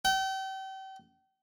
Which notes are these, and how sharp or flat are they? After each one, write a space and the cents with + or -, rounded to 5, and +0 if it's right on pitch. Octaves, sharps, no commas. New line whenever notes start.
G5 -35